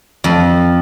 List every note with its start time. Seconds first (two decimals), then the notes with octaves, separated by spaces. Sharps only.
0.24 F2